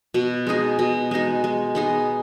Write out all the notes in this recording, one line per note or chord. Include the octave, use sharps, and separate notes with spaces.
B2
G#3 D#4 G#4
B2
G#3 D#4 G#4
G#3
B3 D#4 G#4